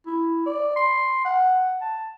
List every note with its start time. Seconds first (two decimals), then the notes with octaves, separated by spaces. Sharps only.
0.07 E4
0.46 D5
0.76 C6
1.25 F#5
1.81 A5